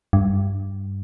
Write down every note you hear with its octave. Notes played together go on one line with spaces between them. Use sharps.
G2